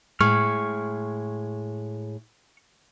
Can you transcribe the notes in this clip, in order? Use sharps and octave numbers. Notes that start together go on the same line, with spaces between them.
A2 G#3 C#6 F6